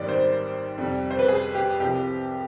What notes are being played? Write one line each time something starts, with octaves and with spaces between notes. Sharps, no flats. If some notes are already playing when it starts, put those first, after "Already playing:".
Already playing: G#1 G#2 D#3 G3 D5
C5
F2 C3 G3
C5
B4
G#4
G4
C2 C3 F3 G4